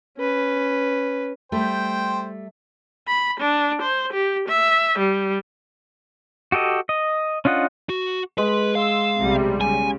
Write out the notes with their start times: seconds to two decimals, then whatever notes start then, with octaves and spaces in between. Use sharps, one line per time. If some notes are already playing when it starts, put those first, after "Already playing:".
0.18 C#4 B4
1.52 G3 A3 C5 G5
3.08 B5
3.40 D4
3.82 C5
4.13 G4
4.48 E5
4.98 G3
6.52 F#4 G4 A4 D#5
6.89 D#5
7.45 C#4 D4 F4 D#5 F#5
7.89 F#4
8.38 G#3 B4
8.75 F5 C6 E6
9.17 B1 C3 G3
9.61 C#3 G#5